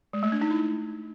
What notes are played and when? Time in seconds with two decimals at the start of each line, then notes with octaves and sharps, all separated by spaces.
0.13 G#3
0.23 A3
0.32 D4
0.41 D#4
0.51 E4